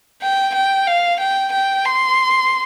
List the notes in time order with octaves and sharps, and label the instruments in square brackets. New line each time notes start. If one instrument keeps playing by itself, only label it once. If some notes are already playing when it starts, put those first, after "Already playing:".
[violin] G5
G5
F5
G5
G5
C6